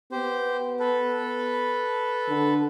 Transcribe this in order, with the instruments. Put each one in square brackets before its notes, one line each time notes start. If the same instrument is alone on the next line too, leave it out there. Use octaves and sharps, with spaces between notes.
[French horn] B3 [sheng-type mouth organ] G4 C5
[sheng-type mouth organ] A4 B4
[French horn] D3